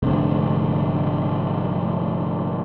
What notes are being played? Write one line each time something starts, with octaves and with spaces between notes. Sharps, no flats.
F1 G#2 D3 C4